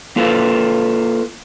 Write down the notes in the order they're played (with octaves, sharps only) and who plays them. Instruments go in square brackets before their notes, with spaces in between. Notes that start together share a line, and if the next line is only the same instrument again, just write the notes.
[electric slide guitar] A#3 F4 A4 B4